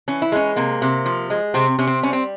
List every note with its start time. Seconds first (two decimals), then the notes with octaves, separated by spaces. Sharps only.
0.08 E3 C#4
0.22 E4
0.32 G#3 C#4
0.56 C3 A#3
0.82 C3
1.06 F3
1.30 G#3
1.54 C3 C4
1.79 C3 C#4
1.87 C4
2.03 G3 C#4
2.13 C4